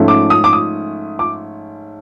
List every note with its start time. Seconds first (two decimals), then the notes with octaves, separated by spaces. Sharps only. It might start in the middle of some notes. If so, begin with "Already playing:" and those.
Already playing: G#2 F3 A3 C#4
0.08 D6
0.30 D#6
0.44 D6
0.53 D#6
1.19 D6